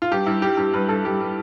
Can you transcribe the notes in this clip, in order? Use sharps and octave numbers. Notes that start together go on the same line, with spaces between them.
F4
G2 G4
G2 E4
G3 G4
G2 G4
G2 B4
G2 A4
G2 G4
G3